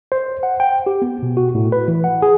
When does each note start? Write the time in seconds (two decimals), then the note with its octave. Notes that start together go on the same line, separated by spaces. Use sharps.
0.12 C5
0.43 F#5
0.60 G5
0.86 G4
1.02 B3
1.23 B2
1.37 F#4
1.55 A2
1.72 B4
1.88 E3
2.04 F#5
2.22 G#4